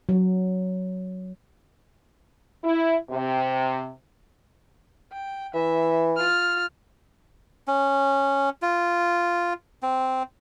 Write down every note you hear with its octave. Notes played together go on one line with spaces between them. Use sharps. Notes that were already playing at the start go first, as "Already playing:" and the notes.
F#3
E4
C3
G5
E3 E5
F4 F6
C#4
F4
C4